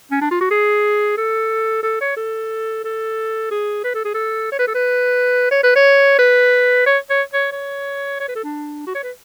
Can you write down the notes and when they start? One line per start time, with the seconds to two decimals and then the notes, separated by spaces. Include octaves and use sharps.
0.11 C#4
0.21 D4
0.31 F4
0.41 F#4
0.51 G#4
1.17 A4
1.83 A4
2.01 C#5
2.17 A4
2.85 A4
3.51 G#4
3.84 B4
3.95 A4
4.05 G#4
4.14 A4
4.52 C#5
4.59 B4
4.67 A4
4.74 B4
5.51 C#5
5.64 B4
5.76 C#5
6.19 B4
6.86 C#5
7.10 C#5
7.34 C#5
7.52 C#5
8.20 C#5
8.28 B4
8.35 A4
8.44 D4
8.87 F#4
8.95 C#5
9.03 B4